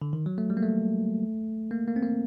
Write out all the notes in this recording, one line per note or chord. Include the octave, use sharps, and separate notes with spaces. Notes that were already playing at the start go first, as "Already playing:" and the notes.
D3
D#3
F#3
A3
G3
A#3
A3
A#3
A#3
C4
A#3